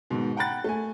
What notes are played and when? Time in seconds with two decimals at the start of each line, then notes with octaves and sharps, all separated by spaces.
0.10 G#2 B2 D#3
0.37 F#5 G5 A#5 B5 F#6 A6
0.64 A3 G#5